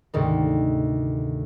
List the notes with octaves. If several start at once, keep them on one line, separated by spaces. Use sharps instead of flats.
D2 G#2 C3 D#3